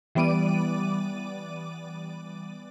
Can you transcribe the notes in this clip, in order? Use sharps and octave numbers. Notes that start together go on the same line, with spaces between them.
E3 G3 B3 D5 D6 D#7